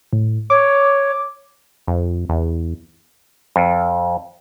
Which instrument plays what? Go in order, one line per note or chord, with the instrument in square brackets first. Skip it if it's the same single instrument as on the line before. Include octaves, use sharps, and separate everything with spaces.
[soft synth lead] A2
[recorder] C#5 [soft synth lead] D6
[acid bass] F2
E2
[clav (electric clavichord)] F2